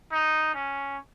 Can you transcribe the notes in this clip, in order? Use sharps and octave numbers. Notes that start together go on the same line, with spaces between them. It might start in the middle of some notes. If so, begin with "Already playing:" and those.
D#4
C#4